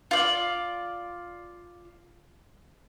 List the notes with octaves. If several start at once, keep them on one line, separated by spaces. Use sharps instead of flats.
F4 D5